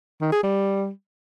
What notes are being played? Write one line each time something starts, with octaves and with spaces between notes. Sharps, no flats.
D#3
G#4
G3